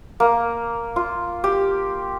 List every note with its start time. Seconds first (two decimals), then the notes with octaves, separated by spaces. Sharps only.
0.20 A#3
0.96 F4
1.44 G4